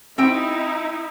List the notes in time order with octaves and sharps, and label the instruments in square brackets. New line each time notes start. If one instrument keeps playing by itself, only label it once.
[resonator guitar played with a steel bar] C4 G5 [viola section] D#4 E4